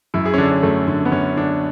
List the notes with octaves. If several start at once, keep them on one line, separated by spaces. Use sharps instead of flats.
F#2 E4
G#4
C#4
D3 D4
C#4
F#2 A3
D3
B3
F#2 C#4
D3 D4